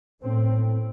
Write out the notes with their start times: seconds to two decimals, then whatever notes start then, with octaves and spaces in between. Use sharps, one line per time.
0.22 A2 C4